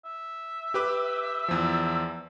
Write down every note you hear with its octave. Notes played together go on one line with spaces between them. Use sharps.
E5
G4 B4 D6
E2 F3